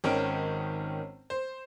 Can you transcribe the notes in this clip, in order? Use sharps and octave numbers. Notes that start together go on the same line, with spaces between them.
G#1 D#3 C#4 D#4 G5 D7
C5